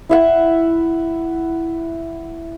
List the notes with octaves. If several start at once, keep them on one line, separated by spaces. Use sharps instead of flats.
E4 E5 F#5